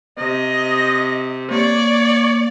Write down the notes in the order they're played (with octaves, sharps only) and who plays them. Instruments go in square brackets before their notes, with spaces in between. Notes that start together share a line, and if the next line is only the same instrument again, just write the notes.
[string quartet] C3 [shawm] D#5
[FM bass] A#3 [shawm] C#5 [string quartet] D5